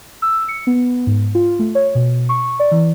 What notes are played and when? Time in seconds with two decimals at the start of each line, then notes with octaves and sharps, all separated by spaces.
0.22 E6
0.48 C#7
0.67 B3
1.07 G#2
1.35 F4
1.59 A3
1.75 C#5
1.95 B2
2.29 C#6
2.60 D5
2.71 E3